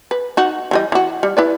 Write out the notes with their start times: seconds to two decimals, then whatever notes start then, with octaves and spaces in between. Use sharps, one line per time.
0.11 B4
0.37 D#4 F#4
0.71 E3 G3 D#5
0.92 E3 F#4
1.23 G3
1.37 E4 B4 D5